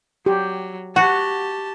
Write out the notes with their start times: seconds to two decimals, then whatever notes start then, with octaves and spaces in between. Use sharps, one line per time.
0.26 F#3 G4
0.96 F#4 G4 F#5 A5